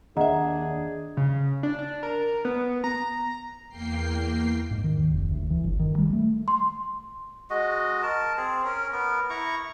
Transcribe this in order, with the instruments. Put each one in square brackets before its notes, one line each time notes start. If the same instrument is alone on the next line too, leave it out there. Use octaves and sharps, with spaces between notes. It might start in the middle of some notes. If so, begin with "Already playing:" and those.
[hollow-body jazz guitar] D#2 E5 [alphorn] D4 [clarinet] G#4 [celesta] D#5 F#5 A#5
[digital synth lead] C#3
D4
D4
A#4
B3
A#5
[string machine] E2 A#3 G5 C7
[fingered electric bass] G#2
D#3
D#2
F1
D2
E3
G1
D#3
G3
A3
[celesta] C6
[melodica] G#3 F#4 D#5
A#4 A5
C4 G#4
C#4 A#4
B3 A#4
E4 A#5 C#6